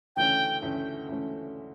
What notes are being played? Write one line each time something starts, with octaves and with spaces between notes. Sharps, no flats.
D2 C#3 E3 A3 C#4 G5
D2 C#3 E3 A3 C#4
D2 C#3 E3 A3 C#4